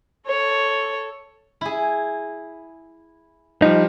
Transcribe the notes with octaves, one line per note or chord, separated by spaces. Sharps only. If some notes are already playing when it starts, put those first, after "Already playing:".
A4 C#5
E4 G#4
F3 G3 D#4